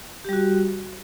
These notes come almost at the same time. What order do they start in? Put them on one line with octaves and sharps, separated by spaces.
G4 G3 F#4